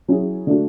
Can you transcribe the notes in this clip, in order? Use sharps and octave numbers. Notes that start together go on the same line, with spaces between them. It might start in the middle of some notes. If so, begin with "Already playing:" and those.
F#3 C#4 E4 G#4
D3 A3 D4 F#4